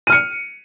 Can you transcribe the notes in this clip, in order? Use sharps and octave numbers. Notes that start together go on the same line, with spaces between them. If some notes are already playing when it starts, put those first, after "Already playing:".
F6 C#7 D#7